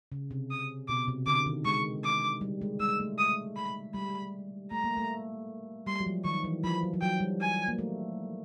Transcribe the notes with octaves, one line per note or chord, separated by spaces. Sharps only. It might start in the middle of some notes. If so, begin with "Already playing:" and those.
C#3
C3
D#6
B2 D6
C3
D3 D6
D#3
G#3 C#6
D6
G3
G#3
G#3 E6
A3
D#6
B5
G3 B5
A3 A#5
A#3
A3
G3 C6
F#3
F3
D#3 C#6
E3
F3 B5
F#3
F3
F#3 G5
G3
G#5
A#3
A3